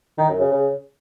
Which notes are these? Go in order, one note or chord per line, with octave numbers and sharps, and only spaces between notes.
D#3
F#2
C#3
C#3